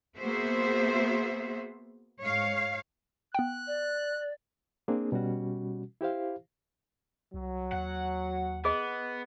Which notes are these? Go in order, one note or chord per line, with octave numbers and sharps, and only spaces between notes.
A#3 B3 F#4 G#4 C5 E5
G#2 C#5 F5
B3 G5 F#6
D5
A#3 C4 D4 G#4
B2 G3 C#4 F#4
E4 G4 C5 F5
C2 F#3
D#2 F#5
B3 G#4 D#5